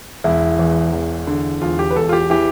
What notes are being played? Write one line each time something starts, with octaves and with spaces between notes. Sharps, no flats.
E1 E4
E2
E1
D3
E1 F4
G4
B4
E1 A4
F4
G4
E3 G4